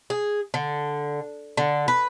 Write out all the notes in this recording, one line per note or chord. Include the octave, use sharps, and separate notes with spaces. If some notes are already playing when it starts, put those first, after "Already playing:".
G#4
D3
D3
B4